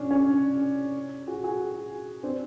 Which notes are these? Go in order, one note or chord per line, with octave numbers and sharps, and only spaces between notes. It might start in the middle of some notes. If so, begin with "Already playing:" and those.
Already playing: C#4 D4
C#4
F#4 G#4
F#4 G#4
C4 D4